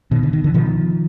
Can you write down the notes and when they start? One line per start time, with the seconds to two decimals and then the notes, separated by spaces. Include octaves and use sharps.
0.11 B2 D#3
0.23 D3
0.33 D#3
0.44 D3 E3
0.54 B2 D#3 F3